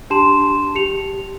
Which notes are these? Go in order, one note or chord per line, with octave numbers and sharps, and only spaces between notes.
D4 G4 A5 C6 E7
G4 C#7 F7